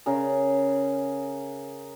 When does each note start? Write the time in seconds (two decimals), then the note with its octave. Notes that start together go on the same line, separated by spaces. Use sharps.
0.06 C#3 G#4 A#4